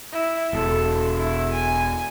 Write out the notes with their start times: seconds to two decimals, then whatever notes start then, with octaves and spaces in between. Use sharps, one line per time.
0.12 E4
0.53 E1 A4
1.17 E4
1.52 G#5